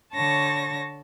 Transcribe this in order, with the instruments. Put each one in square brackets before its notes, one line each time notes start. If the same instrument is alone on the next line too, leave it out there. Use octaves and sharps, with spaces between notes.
[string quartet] D3 C#5 A5 C#6 A#6